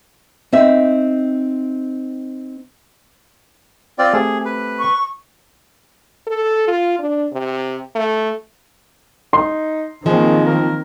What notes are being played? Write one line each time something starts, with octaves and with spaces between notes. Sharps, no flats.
C4 D#4 E5
C4 F4 D5
A3 C4 G4 G#4
B4
C#6
A4
F4
D4
C3
A3
D#4 C6
D#3 F3 G#3 A#3 C4
A#4